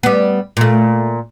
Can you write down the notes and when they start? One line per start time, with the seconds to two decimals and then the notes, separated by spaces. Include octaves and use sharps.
0.03 G3 B3
0.57 A#2 A3